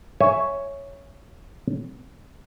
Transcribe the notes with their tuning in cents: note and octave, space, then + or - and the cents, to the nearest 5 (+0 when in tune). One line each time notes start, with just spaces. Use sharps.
C#5 +0 E5 +0 G#5 +0